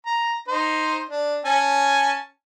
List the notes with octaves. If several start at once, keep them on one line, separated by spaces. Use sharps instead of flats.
A#5
D#4 C5
D4
C#4 G#5 A5